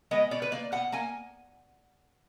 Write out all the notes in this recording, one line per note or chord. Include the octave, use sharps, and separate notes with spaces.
G#3 B3 D#5
B2 D5
B4
A#3 D5
B2 F#5
A#3 G#5